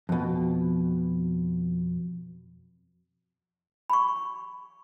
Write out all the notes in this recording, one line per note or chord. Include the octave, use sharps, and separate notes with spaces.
F2 B2
B5 C#6